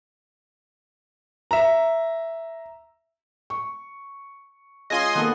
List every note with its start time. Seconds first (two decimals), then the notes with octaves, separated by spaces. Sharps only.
1.51 E5 A#5
3.50 C#6
4.90 G#3 C#4 F4 D#5 G#5 C6
5.15 D#3 A#3 B3 A4 F#5